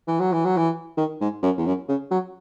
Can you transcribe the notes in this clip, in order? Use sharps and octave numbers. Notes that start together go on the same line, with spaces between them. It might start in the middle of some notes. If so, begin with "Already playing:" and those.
E3
F#3
E3
F#3
E3
D#3
G#2
F#2
E2
F#2
C#3
F#3